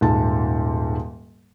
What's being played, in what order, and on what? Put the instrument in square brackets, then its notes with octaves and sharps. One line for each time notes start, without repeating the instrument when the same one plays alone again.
[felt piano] D#1 G#2 A5